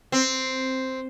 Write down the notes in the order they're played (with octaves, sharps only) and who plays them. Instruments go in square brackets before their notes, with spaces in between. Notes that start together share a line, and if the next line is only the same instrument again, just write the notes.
[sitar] C4